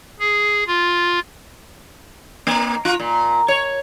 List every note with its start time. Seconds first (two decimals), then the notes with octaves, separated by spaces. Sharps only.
0.20 G#4
0.67 F4
2.47 A#3
2.85 F4
3.00 A#2
3.48 C#5